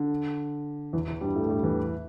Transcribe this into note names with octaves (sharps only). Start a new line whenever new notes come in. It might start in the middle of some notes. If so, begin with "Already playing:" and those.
Already playing: D3
E2 E3
E2 E3
G2 G3
A2 A3
G2 G3
E2 E3